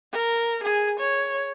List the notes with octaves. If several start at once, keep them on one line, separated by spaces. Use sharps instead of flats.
A#4
G#4
C#5